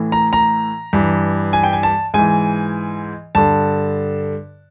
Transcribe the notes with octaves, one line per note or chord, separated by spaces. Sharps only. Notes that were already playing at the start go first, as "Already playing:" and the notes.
Already playing: A2 E3
A#5
A#5
G2 E3
G#5
G5
G#5
A5
G#2 E3 G#5
G2 D3 A5